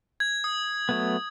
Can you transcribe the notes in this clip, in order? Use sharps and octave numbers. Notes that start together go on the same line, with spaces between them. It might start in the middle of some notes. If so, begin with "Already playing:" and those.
G#6
D#6
F#3 A3 B3